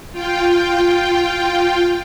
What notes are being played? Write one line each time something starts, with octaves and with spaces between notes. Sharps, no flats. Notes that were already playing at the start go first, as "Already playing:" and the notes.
F4 G5